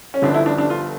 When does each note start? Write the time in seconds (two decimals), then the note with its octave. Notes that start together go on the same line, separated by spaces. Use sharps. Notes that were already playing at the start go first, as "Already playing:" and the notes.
0.14 C#4
0.22 G1 G2 D3 F3 D4
0.34 E4
0.46 D4
0.58 D4
0.70 F4